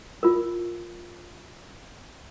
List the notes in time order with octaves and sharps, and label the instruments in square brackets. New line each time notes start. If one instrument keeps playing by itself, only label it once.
[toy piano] F4 A#4